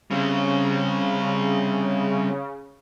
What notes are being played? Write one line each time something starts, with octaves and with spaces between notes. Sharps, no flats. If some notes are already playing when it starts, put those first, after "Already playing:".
C#3 G3 C4